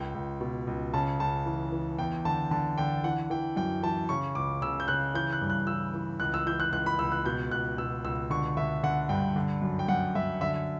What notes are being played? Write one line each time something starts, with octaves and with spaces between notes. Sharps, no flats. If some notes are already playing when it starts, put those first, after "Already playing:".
Already playing: C#2 G5
C#2
B2
C#2
C#3 A5
C#2 A5
E3
E3
E2 G5
D3 A5
D3 A5
D3 G5
E3 F#5
E3 G5
F#2 G5
E3 A5
C#3 C#6
C#2 D6
C#3 E6
G6
C#3 F#6
E3 G6
F#6
G2
F#6
E3 E6
E3
C#2 F#6
E6
E3 G6
F#6
C#2 F#6
B5
C#2 E6
F#6
B2 G6
C#2 F#6
B2 E6
C#2 E6
D3 C#6
D3 E5
D3 F#5
G2 G5
D3
F#2
G5
F#2 F#5
F#2 E5
D3 E5